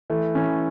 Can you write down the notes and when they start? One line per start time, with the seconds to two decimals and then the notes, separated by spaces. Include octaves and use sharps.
0.10 E3 A3
0.35 E3 C#4